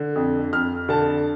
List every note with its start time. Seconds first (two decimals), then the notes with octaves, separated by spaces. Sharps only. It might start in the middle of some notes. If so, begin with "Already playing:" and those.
Already playing: D3
0.16 F2
0.52 F2 F6
0.89 D3 A5